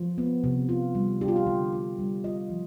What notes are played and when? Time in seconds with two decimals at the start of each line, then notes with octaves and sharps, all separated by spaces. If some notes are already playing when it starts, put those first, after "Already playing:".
Already playing: F3 F4
0.18 B3
0.44 C3
0.69 F4
0.95 G3
1.21 D4 G4
1.28 F4
1.36 G4
1.47 D3
1.73 F4
1.98 G3
2.24 F4 D#5
2.50 F3